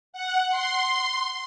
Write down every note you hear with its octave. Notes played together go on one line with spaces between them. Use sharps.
F#5
C6